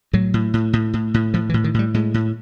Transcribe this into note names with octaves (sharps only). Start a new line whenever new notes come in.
A2 F#3
A2
A2
A2
A2
A2
A2 F3
E3
A2
D#3
A2 G3
A2 G#3
A2